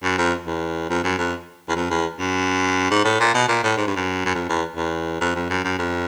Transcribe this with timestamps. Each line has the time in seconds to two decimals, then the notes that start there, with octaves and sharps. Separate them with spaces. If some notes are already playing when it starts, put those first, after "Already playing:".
0.03 F#2
0.18 F2
0.46 E2
0.90 F2
1.04 F#2
1.18 F2
1.69 E2
1.76 F2
1.90 E2
2.19 F#2
2.91 G#2
3.05 A2
3.20 A#2
3.34 B2
3.48 A#2
3.63 A2
3.77 G#2
3.87 G2
3.96 F#2
4.25 F#2
4.35 F2
4.49 E2
4.76 E2
5.21 F2
5.35 F2
5.50 F#2
5.64 F#2
5.79 F2